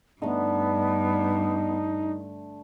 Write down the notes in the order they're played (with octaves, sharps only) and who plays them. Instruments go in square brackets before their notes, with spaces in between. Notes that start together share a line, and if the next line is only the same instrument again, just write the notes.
[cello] G2 [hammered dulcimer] D3 A3 [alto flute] B3 [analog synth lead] D#4